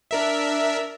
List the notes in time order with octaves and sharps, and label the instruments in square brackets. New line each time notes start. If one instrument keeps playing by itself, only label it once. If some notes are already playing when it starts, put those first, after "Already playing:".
[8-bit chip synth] D4 A#4 E5